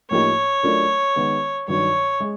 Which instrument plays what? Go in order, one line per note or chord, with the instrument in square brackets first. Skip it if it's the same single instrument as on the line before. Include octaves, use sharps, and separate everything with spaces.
[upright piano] A2 F3 A#3 D#4 G4 [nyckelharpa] C#5
[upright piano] F#3 A3 D4 F4 A#4
D#3 G#3 B3
[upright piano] G2 D#3 F#3 [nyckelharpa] C#5
[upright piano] G#3